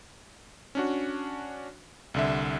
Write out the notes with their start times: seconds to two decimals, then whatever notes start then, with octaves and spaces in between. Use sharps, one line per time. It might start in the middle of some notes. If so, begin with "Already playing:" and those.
0.75 C#4 D4 F#4
2.14 C2 D3 E5